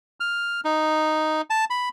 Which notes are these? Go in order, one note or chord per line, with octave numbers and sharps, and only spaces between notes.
F6
D#4
A5
B5